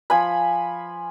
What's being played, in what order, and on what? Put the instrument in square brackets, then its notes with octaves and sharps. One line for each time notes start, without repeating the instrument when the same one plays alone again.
[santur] F3 G#5 B5